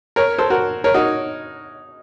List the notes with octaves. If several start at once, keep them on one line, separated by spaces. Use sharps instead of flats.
A#4 C#5
A4 C5
F#4 A#4
A#4 C#5
D#4 F#4